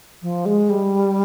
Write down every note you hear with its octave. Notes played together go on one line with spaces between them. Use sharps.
F3
G#3
G3